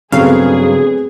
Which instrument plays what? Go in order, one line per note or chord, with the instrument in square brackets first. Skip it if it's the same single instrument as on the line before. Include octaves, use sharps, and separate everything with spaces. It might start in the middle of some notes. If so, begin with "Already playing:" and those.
[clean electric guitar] G2 C#3 F#3 [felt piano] A3 B3 C4 [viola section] G#4 [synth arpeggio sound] F5